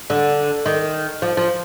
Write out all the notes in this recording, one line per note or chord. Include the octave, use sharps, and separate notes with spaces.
D3
D#3
F3
F3